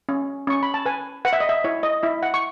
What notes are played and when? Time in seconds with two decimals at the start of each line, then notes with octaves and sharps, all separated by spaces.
0.09 C#4
0.47 C#4 C#6
0.63 B5
0.74 A5
0.86 B4 G#5
1.25 B4 F#5
1.33 E5
1.40 D#5
1.49 E5
1.64 E4 C#5
1.83 D#5
2.03 E4 E5
2.23 F#5
2.34 C#6